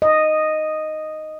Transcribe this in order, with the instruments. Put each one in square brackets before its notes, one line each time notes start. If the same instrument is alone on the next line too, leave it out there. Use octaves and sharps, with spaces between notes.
[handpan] D#5